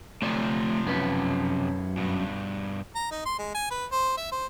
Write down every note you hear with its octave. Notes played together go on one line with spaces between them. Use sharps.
C3 F3 A3 C#5 D5
F#2 C#4 B4
G2 B2
A#5
D#4
C6
G#3
G#5
B4
C5
E5
C5